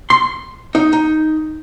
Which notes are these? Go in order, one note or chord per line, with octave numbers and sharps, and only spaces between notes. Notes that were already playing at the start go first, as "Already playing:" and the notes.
C6
D#4
D#4